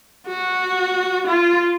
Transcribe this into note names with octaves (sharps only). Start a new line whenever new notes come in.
F#4
F4